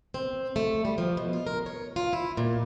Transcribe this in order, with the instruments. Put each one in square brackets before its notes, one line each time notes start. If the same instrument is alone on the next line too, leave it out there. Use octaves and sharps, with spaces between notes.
[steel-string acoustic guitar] C4
A3
G3
F3
B2
F4
A#4
C#5
F4
E4
A#2